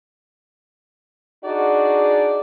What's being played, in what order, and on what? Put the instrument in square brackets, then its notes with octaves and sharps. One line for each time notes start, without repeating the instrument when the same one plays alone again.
[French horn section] D4 D#4 F#4 G#4 D5 D#5